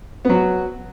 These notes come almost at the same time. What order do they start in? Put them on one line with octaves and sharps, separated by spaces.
B3 F#3 F#4